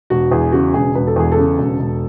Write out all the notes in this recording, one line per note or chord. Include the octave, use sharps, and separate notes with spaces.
E1 F#4
E2 G#4
C#3 F#4
E1 G#4
E1 B4
A4
E2 G#4
A4
C#3
E1
E1